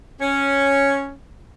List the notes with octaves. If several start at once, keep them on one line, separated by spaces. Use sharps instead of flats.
C#4